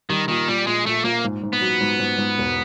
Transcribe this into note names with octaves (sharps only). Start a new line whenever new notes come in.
D#3 G3
A#2 D#3
A#2 G3
A#1 G#3
A#1 A3
A#1 A#3
G#2
G#2
B3
F#3
G#2
G#2
G#2
E1